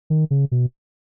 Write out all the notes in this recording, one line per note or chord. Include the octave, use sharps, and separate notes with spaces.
D#3
C#3
B2